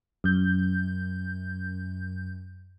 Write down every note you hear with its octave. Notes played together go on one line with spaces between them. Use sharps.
F#2 G6